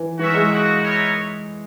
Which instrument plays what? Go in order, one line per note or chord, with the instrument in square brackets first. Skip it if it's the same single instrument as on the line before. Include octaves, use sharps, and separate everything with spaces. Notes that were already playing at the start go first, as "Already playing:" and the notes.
Already playing: [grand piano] E3
[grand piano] E3 [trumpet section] F#4 A#4 C#5 E5
[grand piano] G#3
[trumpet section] A#3 D#4 F#4
B3 D#4 A#4 C#5 E5